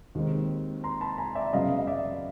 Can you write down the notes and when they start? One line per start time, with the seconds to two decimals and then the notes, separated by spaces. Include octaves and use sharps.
0.15 D#2 D#3 G#3 C4
0.84 A#5 C6
1.01 A5 B5
1.18 G#5 A#5
1.35 D5 E5
1.53 F#2 C#3 F#3 B3 D#5 F5
1.78 D#5
1.87 D5 E5